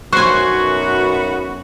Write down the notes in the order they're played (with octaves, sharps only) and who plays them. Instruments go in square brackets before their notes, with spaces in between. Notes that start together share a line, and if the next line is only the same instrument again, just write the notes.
[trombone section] B1 F#2 [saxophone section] B3 F#4 [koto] C5 G#5 [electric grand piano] C#6 F#6